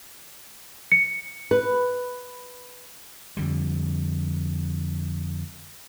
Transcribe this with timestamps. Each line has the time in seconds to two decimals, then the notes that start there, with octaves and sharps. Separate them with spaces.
0.92 C#7
1.51 B4
3.37 F2 D3 G3